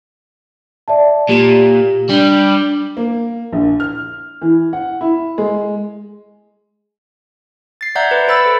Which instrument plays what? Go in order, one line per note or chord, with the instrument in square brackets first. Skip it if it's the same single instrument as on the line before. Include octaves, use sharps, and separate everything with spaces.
[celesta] D5 E5 A5
[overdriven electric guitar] A#2 [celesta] G4 E7
[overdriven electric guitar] G3 [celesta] D4
[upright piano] A#3
A#1
F6
E3
F#5
E4
G#3
[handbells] A6 C7
D5 E5 F#5 A#5 G6 G#6
B4
B4 C5 B5 E6 A6 C#7
A4